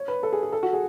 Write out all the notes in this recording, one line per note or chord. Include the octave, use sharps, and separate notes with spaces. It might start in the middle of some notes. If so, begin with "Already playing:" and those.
Already playing: C#5
B4
A4
G#4
G#4
A4
F#4
G#4